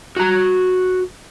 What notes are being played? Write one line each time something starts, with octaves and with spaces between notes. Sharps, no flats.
F#4 A#5